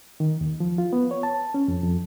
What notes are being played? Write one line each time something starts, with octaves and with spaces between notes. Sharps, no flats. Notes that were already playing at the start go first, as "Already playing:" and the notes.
D#3
D#2
F3
F4
B3
C#5
A5
C#4
F2
F2